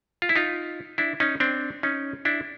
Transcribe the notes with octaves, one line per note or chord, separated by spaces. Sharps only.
F4
E4
D#4 F4
D4 E4
C#4 D#4
C4 D4
C#4 D#4
D4 E4